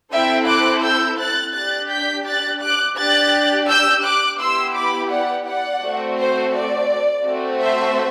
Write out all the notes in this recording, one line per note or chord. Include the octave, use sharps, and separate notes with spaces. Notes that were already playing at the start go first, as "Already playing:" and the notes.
C4 E4 A4 E5 G5
D6 F#6
E6 G6
F#6 A6
D4 G4 F#6 A6
G6 B6
F#6 A6
D6 F#6
D4 G4 F#6 A6
E6 G6
D6 F#6
B3 E4 G4 C6 E6
B5 D6
D5 F#5
D5 F#5
A3 C4 F#4
C5
D5
A3 C4 F#4
C5 E5